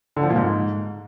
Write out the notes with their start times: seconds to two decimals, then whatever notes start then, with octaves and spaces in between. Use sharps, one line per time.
0.16 D3
0.23 F3
0.30 A#2
0.36 G#2